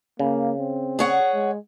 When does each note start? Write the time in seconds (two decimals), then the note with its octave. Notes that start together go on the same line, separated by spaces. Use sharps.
0.19 C#3 A#3
0.59 C4
0.99 G#4 C#5 F#5
1.34 G#3